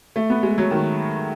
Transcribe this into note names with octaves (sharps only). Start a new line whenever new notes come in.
A3
B3
G#3
F#3
D#3